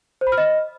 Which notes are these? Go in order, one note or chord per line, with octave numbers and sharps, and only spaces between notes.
C5
B5
F6
D#5